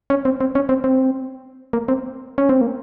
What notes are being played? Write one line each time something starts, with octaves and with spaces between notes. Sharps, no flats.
C#4
C4
C4
C#4
C4
C4
A#3
C4
C#4
C4
A#3